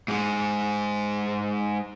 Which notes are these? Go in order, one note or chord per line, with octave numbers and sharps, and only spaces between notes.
G#2 G#3